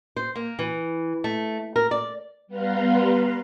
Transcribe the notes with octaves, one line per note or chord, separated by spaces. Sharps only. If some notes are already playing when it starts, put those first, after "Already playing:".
C5
A#3
E3
A3
A#4
D5
G3 B3 B4 F5 A#5 C6